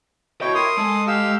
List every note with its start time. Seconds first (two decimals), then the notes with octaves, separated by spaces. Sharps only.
0.41 E4 F#4 C#5 D#5 G5
0.55 A#4 C6 D#6
0.77 G#3 A4
1.08 G4 F5 E6